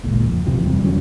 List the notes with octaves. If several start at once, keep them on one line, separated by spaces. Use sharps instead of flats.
G#1 C#2 A#2
F2
F2 C3 E3 F3
E2 G3 C4
D3 E3 F#3 C#4